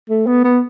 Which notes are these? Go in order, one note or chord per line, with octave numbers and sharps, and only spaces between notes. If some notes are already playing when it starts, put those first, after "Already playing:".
A3
B3
B3